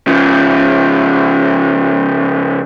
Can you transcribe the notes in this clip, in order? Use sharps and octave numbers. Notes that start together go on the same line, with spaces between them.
C#3 F3